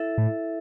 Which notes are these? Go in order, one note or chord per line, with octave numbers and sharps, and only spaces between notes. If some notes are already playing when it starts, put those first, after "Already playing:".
Already playing: E4 A4 E5
A2